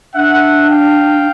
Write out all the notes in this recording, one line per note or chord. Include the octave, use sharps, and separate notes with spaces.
D4 E5 F#5
F5 G5